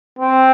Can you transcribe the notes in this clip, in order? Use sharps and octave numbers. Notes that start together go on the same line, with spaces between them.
C4